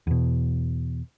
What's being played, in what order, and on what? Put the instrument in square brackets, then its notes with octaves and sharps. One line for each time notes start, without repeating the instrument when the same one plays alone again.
[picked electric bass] E2 B2